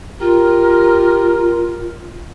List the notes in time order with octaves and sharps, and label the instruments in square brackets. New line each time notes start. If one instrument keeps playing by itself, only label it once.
[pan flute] F4 [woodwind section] G4 A#4